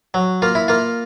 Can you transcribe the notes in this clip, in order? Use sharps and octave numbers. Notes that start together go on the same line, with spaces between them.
F#3
A#3 F4
E4
A#3 F4